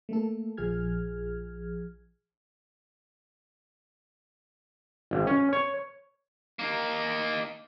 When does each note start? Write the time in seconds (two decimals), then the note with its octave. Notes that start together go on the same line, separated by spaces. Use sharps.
0.09 A3 A#3 A4
0.57 A#1 F3 G#4 F6 G#6
5.11 G#1
5.27 C#4
5.53 C#5
6.59 A#3 D#4